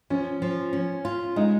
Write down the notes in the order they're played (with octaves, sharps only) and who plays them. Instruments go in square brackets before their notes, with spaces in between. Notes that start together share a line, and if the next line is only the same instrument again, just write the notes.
[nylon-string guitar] F3 [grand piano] C#4
[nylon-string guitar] F3
C#4
F4
[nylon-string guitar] G#3 [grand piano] D#4